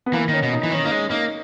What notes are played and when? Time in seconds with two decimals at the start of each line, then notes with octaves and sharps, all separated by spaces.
0.06 B3
0.13 E3 A#3
0.28 D#3 C#4
0.43 B2
0.53 D#4
0.63 E3
0.72 D#3 C#4
0.85 A#3 D#4
0.91 G#3 C#4
1.11 A#3 D#4